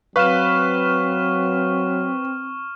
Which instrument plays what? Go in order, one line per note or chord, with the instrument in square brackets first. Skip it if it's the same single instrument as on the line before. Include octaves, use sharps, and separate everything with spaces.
[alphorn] F#3 [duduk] C4 [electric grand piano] B4 F5 [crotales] C#6 F6 E7